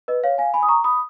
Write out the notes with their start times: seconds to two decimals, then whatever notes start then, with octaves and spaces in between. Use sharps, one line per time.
0.08 B4 D#5
0.24 C#5 F5
0.38 F5 G#5
0.54 G#5 B5
0.63 D#6
0.68 A#5 C#6
0.84 B5 D#6